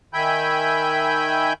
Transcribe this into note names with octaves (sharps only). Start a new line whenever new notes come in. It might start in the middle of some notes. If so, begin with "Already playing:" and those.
D#3 E5 G5 G#5 B5 G6